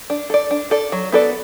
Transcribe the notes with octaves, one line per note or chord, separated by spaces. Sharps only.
D4
A4 D5
D4
A4 D5
F#3
B3 F#4 A4 D5